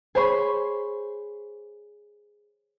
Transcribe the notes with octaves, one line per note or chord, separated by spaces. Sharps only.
G#4 C5 C#5 G#5 B5 C#6